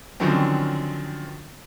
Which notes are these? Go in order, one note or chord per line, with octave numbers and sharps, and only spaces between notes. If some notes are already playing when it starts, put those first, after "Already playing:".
D3 D#3 F3 F#3 C4 C#4